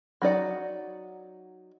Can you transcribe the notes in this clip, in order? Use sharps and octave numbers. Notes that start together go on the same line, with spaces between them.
F#3 D#4 D5 F#5